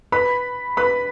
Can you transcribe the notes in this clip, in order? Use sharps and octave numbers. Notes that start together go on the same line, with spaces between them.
B4 B5
B4 B5